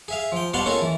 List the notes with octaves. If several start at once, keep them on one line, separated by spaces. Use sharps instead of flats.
G#4 E5 F5
F3 G5
B2 G3 F5 F#5 A5 C6
A#3 C#4 D#4 F4 G#4 A4
E3